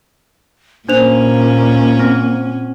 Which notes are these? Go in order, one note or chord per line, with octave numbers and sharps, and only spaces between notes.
A#2 A#3 C#4 D4 C5 F7
C4